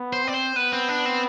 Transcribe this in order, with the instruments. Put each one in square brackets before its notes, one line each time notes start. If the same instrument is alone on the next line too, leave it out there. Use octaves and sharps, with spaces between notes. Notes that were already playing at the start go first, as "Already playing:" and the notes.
Already playing: [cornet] B3
[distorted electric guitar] C5
[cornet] C4 [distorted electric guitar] D5
[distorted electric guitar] C5
[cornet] B3 [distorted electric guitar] B4
[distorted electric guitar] C4
D4
C4